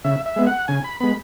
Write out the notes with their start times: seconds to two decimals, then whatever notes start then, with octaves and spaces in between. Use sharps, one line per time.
0.04 C#3 E5
0.26 E5
0.36 G#3 B3
0.47 F#5
0.68 C#3 G#5
0.84 B5
1.00 G#3 B3 B5